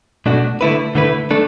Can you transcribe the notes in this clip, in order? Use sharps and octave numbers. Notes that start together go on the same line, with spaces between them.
B2 A3 D4 F#4
D3 A3 E4 B4
D3 A3 E4 B4
A3 D4 A4